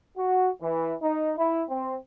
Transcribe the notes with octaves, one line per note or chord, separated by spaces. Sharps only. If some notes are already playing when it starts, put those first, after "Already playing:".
F#4
E3
D#4
E4
C4